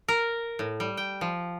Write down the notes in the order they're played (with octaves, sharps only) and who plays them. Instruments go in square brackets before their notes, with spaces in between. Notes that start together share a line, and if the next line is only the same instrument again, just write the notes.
[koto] A#4
A2
G3
G5
F3